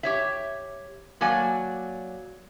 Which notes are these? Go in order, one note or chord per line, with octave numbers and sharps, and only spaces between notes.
G4 C#5 E5
F#3 A#3 D5 G#5